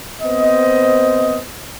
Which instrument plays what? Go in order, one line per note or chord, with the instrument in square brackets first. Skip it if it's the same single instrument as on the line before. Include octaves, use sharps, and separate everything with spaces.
[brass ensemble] B3 C4 C5 D#5